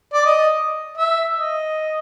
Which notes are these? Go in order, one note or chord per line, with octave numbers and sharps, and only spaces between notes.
D5
D#5
E5
D#5